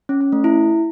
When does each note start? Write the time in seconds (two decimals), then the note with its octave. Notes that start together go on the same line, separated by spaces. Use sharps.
0.09 C#4
0.21 C#4
0.32 A3
0.44 E4